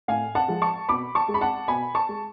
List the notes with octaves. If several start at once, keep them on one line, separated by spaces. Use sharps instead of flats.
A2 F5 G#5
F#5 A5
F3 G#3
A5 C#6
B2 B5 D6
A5 C#6
G#3
B5
F#5 A5
B2 G#5 B5
A5 C#6
G#3